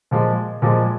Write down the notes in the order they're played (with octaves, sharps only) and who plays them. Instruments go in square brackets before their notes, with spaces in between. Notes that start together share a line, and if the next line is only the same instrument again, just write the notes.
[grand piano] A#2 F3 G#3
A#2 F3 G#3